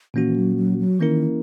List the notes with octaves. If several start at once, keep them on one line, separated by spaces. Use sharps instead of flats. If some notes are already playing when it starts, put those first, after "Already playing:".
A#2 E3 A#3 C#4 F#4
E3
F#3
F#3
F#3
D#3 E3 A#3 C#4 E4 A#4